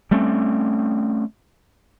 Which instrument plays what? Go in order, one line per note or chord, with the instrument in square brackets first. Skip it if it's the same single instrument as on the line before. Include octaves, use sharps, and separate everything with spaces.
[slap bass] G3 A3 C4 C#4